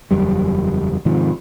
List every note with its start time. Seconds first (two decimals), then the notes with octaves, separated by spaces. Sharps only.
0.11 F#1 E2 F#3 G3
1.05 G#2 C3 D#3 F3